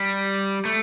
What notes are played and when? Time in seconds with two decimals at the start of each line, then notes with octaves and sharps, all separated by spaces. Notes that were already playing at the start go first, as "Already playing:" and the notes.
Already playing: G3
0.65 A3